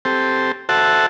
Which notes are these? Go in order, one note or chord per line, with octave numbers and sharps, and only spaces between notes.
C4 G4 A4 C5
F#4 A4 C5 E5 F#5 A5